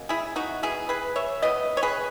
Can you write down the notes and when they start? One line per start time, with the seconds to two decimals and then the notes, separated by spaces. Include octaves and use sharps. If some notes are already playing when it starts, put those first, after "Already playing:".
Already playing: B2 A#3 C#4
0.09 E4 G#4
0.36 D#4 F#4
0.63 E3 B3 E4 G#4
0.89 G#4 B4
1.16 C#5 E5
1.42 C#3 E3 B3 B4 D#5
1.77 C#5
1.83 G#4 B4